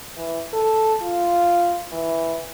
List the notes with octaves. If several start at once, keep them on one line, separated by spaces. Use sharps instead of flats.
E3
A4
F4
E3